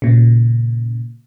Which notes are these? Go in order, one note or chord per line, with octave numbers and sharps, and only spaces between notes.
A#2 C#3